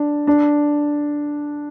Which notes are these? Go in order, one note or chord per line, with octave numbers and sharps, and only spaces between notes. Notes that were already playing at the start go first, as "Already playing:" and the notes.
Already playing: D4
D4